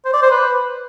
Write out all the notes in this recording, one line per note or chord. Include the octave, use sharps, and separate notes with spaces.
C5
D5
C5
B4